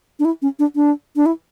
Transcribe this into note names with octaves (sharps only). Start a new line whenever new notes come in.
D4
E4
C#4
D4
D4
D4
E4